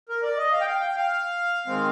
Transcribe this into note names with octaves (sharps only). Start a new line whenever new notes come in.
A#4
D5
D#5
F5
G5
F5
G5
F5
D#3 G#3 C4